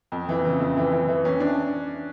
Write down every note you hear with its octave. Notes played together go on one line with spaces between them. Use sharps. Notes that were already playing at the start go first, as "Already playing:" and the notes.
F2
E3
C#3
F2
E3
E3
E3
C#4
D4